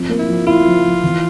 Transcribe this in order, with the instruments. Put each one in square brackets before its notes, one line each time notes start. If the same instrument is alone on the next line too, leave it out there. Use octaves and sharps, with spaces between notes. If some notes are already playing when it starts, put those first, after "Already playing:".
Already playing: [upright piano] F3 C4
A#3
[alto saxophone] E4
[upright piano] F3
[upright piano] E4 [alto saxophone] F4
[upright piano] F3
F3
E3